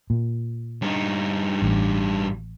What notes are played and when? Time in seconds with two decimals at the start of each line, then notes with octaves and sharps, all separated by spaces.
0.10 A#2
0.82 G2 D#4
1.62 A1